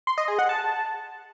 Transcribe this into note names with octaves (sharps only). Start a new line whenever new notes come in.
C6
D#5
G#4
F#5
A5